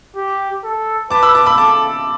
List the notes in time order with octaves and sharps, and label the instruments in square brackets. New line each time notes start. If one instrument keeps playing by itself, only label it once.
[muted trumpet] G4
A4
[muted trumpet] B4 [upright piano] A5 D6
[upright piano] B5 E6
A5 D6
B5 E6
[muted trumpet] A4 [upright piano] A5 D6